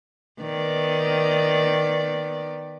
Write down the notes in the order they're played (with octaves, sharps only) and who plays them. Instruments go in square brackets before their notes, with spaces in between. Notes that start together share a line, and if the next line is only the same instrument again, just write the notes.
[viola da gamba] D#3 B3 D5